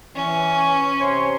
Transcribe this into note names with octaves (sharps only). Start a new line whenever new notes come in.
E3 C#4
C3 C#5 C6